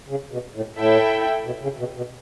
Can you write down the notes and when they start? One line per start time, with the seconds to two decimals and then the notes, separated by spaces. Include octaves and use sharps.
0.09 C#3
0.31 B2
0.55 A2
0.77 A2 E4 A4 E5 G5
1.46 B2
1.63 C#3
1.79 B2
1.97 B2